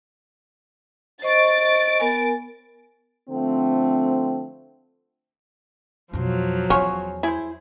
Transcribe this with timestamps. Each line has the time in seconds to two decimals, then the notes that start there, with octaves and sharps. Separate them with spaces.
1.22 C5 D#5 C#6 A6 D7
2.00 B3 A#4 G#5
3.29 D3 F3 A3 C4
6.13 F2 B2 F3 F#3
6.70 E2 C#4 F4 F#4 C#5
7.23 E4 G#4 C5